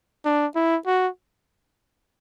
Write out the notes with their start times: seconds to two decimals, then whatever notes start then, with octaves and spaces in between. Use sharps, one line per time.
0.25 D4
0.55 E4
0.86 F#4